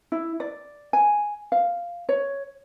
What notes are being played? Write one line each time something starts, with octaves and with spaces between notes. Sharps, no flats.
E4
D5
G#5
F5
C#5